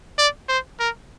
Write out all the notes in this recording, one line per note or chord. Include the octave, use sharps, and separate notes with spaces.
D5
C5
A#4